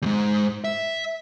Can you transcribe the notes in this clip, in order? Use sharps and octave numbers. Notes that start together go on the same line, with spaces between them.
E2 G#2
E5